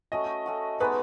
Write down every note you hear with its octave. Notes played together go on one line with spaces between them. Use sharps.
A3 C#4 F#4 D#5
A3 C#4 F#4
G#3 B3 D#4 F#4 B4